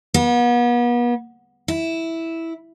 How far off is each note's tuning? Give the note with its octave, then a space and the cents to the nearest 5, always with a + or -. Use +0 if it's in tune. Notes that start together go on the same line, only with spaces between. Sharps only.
B3 -40
E4 -5